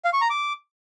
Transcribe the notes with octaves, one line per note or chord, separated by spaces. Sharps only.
F5
C#6
A#5
D6